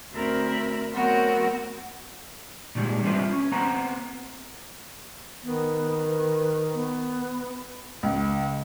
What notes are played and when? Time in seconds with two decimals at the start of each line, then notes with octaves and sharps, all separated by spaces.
0.12 D2 C4 A#4 E5 B5
0.94 F#3 A3 B3 C4 F#4 A#4
2.75 A#2 D#3 E3 G3 G#3
3.03 G3 C4 D4 F4 B4 E5
3.32 C#4
3.52 B3 C4 B4 C5 F#5 A#5
5.43 D#3 B3
6.07 B4
6.74 B3
8.03 C#2